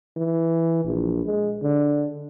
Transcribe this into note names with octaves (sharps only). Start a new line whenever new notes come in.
E3
A#1
G#3
D3